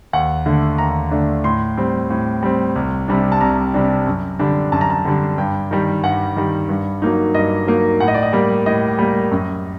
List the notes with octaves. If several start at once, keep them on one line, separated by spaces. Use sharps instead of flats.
D#2 F#5
D3 A3 D4
D#2 A#5
D3 A3 D4
A2 C6
G3 C4
A2
G3 C4
C2
C3 G3 D4
A5
C2 A#5
C3 G3 D4
F#2
D3 G3 D4
F#2 A5
A#5
A5
D3 G3 D4
G2 G5
D#3 G3
G2 F#5
D#3 G3
G2
F#3 A#3 D#4
G2 D#5
F#3 A#3 D#4
A2 F#5
D#5
D5
D#5
G3 A#3
A2 D#5
G3 A#3
F#2